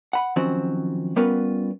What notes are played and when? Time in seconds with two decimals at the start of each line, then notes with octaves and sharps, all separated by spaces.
0.13 F#5 B5
0.36 D#3 F3 F#3 C4 C#4 F#4
1.16 G3 B3 C#4 F4 A#4 B4